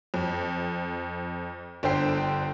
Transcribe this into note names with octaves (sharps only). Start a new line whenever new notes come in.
F2
G1 D3 C5 G5 C7